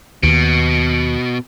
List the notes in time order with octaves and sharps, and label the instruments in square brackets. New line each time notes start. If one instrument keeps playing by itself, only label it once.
[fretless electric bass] D#2 [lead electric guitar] B2